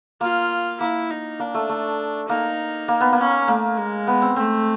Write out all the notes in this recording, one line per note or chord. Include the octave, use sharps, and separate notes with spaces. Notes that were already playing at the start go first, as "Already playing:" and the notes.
A#3 F4
A#3 E4
D#4
A#3 D4
A3
A3
A#3 D#4
A#3
B3
A#3
C#4
A3 A#3
G#3
B3
C4
A3 C4